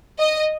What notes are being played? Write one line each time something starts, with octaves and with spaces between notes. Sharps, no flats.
D#5